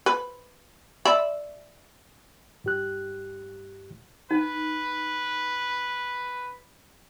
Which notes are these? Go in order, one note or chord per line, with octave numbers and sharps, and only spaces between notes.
B4
D5 E5 B5
G2 G4 F#6
D#4 B4